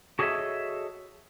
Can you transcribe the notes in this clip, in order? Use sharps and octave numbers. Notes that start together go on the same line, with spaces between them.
F#4 G#4 A4 C#5 D#5 E5